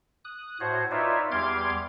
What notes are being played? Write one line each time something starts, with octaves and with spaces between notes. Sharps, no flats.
D#6 F#6
A2 F#4 C5 C#5
D#4 F4 B4 C#5 D5 E5
E2 G3 C6 D6 F6 G#6